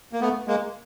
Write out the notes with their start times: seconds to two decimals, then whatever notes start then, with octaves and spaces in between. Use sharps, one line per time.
0.13 A#3
0.21 A3 B3
0.48 G#3 A#3